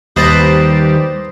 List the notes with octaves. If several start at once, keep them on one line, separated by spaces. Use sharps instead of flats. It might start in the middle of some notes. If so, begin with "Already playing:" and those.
D#2 G3 B4 C5 D#5 A5 A#5